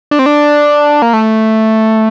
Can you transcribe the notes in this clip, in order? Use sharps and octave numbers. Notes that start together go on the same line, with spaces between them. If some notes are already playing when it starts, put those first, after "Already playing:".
D4
C4
D4
A#3
A3